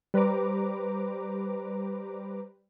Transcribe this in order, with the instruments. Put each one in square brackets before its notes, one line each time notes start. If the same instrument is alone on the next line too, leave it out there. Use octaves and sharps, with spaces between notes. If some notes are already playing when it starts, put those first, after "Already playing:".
[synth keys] G3 B4 C5 A#5 D6